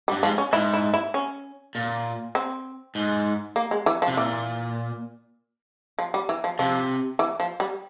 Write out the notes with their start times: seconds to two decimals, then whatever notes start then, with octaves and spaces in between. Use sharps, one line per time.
0.08 G3
0.12 G2
0.23 G#2 F3
0.38 C#4
0.53 G#2 E4
0.73 E4
0.94 E4
1.14 C#4
1.75 A#2
2.35 C4
2.95 G#2
3.56 A#3
3.71 G#3
3.86 E3
4.02 F3
4.08 C3
4.17 A#2 E3
5.99 F3
6.14 G3
6.29 E3
6.44 F3
6.59 C3 F3
7.19 E3
7.40 F3
7.60 G3